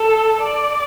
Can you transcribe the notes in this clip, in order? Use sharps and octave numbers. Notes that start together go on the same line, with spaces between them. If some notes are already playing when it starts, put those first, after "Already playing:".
Already playing: A4
D5